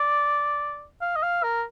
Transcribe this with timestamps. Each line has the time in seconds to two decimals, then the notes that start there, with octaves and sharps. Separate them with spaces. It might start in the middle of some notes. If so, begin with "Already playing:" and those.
Already playing: D5
1.01 F5
1.16 D#5
1.22 F5
1.43 A#4